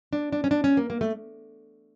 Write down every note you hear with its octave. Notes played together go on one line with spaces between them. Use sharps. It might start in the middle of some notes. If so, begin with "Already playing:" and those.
D4
D4
C#4
D4
C#4
A#3
A#3
A3